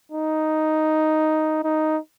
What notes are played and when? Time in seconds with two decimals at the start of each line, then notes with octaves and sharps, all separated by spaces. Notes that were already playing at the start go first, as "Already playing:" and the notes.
0.12 D#4
1.64 D#4